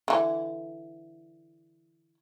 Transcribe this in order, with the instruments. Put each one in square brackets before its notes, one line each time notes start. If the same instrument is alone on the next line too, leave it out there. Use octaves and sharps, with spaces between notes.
[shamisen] D3 E3